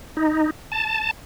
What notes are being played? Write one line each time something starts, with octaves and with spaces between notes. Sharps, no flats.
D#4
A5